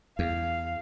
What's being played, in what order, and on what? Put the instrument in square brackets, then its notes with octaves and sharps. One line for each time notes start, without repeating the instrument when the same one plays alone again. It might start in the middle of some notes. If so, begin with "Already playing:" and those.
[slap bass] E2 [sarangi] F5